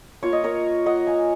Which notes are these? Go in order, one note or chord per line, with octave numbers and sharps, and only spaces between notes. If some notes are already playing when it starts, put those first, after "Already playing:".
A#3 F4 C#5
D#5
A#4 C#5
D#5 F#5
F5 G#5